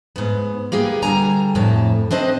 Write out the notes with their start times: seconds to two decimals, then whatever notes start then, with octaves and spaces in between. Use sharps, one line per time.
0.16 G#2 B3
0.72 A#3 B3 G4 G#4
1.02 D3 G3 G#5 A#5
1.55 F2 A2 A5
2.11 C4 D4 C5 D#5